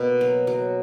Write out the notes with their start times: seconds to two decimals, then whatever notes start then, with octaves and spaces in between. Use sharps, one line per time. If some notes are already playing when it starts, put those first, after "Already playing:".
Already playing: B2 A#3
0.21 F#3
0.47 F#3